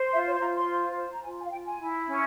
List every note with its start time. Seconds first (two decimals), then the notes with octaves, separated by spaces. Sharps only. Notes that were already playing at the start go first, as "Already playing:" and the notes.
Already playing: C5
0.13 F4 E5
0.26 C#5
0.40 F4 A#5
0.54 C6
0.68 C5
0.96 C5
1.14 A#5
1.24 F4 G#5
1.39 G#5
1.46 F5
1.52 F4 G5
1.66 G#5
1.79 E4
2.08 C#4